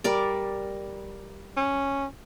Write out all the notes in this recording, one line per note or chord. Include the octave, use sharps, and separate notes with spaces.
G3 A#4 D5
C#4